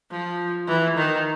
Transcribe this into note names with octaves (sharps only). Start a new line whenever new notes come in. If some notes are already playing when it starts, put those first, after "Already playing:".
F3
E3
D#3